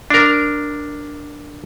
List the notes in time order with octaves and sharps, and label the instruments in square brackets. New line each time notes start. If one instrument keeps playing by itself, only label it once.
[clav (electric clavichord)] D4 A#4